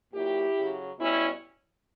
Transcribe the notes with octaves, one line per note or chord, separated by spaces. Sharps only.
A#2 F#3 E4 G4
C#3 F#3
B2 G3 C#4 E4